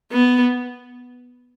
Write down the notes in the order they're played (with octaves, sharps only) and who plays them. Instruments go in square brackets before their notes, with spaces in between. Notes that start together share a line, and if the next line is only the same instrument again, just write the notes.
[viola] B3